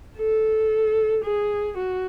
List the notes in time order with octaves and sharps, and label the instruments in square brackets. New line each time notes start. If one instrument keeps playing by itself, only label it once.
[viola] A4
G#4
F#4